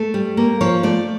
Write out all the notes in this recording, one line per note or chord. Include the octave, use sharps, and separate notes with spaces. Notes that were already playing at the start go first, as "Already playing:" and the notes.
Already playing: A3 A4
G3
A#3
F3 C#5
A3 D5